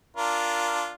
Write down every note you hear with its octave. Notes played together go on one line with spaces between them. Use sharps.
D4 F4 A#4